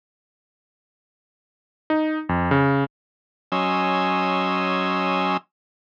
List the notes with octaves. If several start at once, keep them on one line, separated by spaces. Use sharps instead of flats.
D#4
F2
C#3
F#3 C#4 D#5 G#5 C6 E6